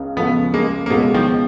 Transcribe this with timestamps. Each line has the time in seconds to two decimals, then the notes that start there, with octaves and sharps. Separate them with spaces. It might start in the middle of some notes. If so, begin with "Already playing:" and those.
Already playing: C#2 C#3
0.17 C#2 C#3 F3 A3 B3
0.54 G#3 A#3
0.86 A#3
0.90 C#2 B2 G#3 A3 B3 C#4 F#4
1.14 D#3 F3